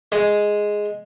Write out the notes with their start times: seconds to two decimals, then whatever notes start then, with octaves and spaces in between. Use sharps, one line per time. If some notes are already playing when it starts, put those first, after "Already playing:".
0.12 G#3